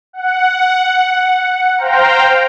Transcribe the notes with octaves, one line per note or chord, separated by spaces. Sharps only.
F#5
C5 F5 G5 A#5